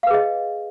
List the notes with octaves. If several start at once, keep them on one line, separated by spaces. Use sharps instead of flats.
G#4 B4 D#5 F5